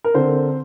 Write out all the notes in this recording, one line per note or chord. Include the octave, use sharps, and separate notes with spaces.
A#4
D3 C4 C5